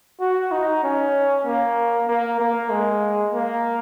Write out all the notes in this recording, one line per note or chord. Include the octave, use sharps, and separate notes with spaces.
F#4
D#4
C#4
A#3
A#3
A#3
G#3
A#3